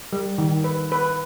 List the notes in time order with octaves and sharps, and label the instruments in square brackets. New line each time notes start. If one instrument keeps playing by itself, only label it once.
[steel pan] G3
D#3
B4
B4